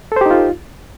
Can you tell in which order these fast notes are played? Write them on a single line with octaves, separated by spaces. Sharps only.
A4 C5 G4 D#4 F4